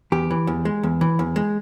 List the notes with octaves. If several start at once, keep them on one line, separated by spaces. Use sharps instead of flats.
E2 G4
E3
E2
G#3
E2
E3
E2
G#3